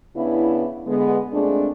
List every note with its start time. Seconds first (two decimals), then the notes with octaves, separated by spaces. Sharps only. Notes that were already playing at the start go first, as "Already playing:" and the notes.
0.16 C#3 B3 D4 E4
0.87 D3 G#3 B3
1.33 A#2 G#3 A3 C4 D4